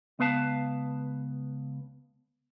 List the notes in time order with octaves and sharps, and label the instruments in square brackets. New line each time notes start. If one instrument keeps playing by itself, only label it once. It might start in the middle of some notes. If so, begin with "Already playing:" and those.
[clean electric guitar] C#2 B3 B4 F5 A5